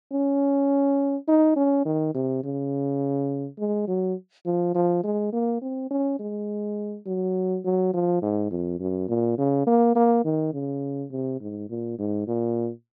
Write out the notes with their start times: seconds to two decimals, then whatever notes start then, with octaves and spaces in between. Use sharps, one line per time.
0.12 C#4
1.28 D#4
1.56 C#4
1.85 D#3
2.14 C3
2.44 C#3
3.59 G#3
3.88 F#3
4.46 F3
4.75 F3
5.04 G#3
5.33 A#3
5.61 C4
5.91 C#4
6.19 G#3
7.06 F#3
7.64 F#3
7.93 F3
8.22 G#2
8.51 F2
8.79 F#2
9.09 A#2
9.38 C#3
9.67 A#3
9.96 A#3
10.24 D#3
10.53 C#3
11.11 C3
11.41 G#2
11.70 A#2
11.98 G#2
12.27 A#2